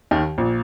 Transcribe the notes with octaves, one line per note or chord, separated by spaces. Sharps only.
D#2 D#3
A#1 A#2